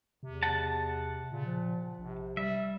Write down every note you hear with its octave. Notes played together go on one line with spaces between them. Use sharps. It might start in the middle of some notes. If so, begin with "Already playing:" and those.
E2 C3
F#5 A5
A#2 C#3
F3
A#1 C3
G3 E5